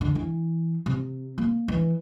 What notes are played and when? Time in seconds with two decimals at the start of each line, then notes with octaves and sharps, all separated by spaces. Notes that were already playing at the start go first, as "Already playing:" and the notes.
0.01 D3
0.15 E3
0.86 C3
1.38 A#3
1.68 E3